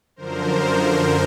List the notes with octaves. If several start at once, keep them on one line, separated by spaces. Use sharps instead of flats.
F#2 D3 F3 A#4 C5